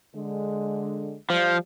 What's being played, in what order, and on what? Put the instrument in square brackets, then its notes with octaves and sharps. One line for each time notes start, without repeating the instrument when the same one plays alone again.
[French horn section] D3 G#3
[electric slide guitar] F3 [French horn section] G3